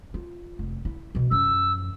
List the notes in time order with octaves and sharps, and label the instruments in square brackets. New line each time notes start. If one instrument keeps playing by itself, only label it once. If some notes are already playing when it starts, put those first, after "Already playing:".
[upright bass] F4
F1
E4
B2 E3
[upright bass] F#2 F3 [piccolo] E6